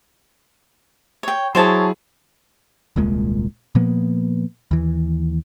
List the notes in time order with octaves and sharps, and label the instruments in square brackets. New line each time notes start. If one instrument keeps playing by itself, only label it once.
[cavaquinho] C#5 G5
[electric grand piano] F#3 E4 G#4 [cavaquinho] C5 C#5 A5
[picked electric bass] D#1 C2 A#2 G#3
A#2 F3 A#3 B3
D#2 E3